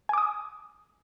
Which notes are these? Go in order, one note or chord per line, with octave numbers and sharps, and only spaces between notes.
G#5 D6 D#6